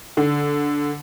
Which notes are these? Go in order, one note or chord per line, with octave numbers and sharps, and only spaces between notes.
D3